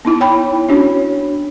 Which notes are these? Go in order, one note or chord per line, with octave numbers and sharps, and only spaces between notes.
B3 D#4 E4
C#5 G5 B5
C#4 D4 F#4 C#5